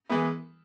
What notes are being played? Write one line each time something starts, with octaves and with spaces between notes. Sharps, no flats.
E3 G#3 B3 E4